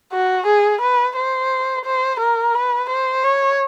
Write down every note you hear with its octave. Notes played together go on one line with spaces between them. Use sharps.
F#4
G#4
B4
C5
C5
A#4
B4
C5
C#5